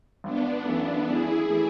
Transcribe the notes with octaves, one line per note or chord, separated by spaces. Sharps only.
G#1 B3 D4
F#2 E3 A3
G#1 E4 G#4
E3 A3